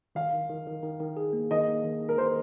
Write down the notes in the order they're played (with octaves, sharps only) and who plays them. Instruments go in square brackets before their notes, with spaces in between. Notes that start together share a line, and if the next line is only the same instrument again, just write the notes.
[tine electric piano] D#3 [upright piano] F5
[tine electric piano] D#3
D#3
D#3
D#3
D#3
G#4
A#3
[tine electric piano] D#3 [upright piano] D#5
[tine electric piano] A#3
D#3
D#3
[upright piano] A#4
[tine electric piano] D#3 [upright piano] C5